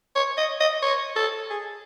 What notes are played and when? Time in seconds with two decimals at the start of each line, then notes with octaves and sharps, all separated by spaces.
0.15 C#5
0.37 D#5
0.60 D#5
0.82 C#5
1.16 A4
1.50 G#4